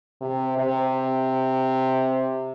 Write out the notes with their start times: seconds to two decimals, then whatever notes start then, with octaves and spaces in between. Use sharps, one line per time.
0.21 C3
0.58 C3